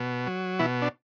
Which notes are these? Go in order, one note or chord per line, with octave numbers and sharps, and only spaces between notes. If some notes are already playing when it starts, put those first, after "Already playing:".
Already playing: B2
F#3
B2 E3 E4
D4